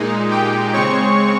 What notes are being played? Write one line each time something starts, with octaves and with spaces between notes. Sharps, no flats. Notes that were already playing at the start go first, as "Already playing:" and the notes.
Already playing: A#2 G#3 D#4
G4 G5
C#3 G#3 C4 C#5 C#6